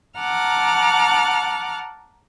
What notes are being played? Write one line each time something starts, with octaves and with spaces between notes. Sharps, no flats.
F#5 A5 A#5 D6 F6